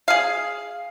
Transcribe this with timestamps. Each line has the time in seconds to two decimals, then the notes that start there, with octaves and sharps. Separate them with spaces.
0.08 G#4 F5